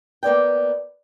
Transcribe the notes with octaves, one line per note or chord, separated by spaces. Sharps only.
A#3 B3 D5 G5